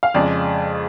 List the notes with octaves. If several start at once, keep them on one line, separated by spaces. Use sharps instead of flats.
F5
F2 C#3 G#3 D5